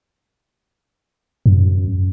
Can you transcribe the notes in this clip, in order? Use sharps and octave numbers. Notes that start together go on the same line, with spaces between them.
F#2